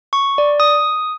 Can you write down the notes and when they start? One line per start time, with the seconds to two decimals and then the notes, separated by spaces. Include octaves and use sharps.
0.13 C#6
0.38 D5
0.60 D#6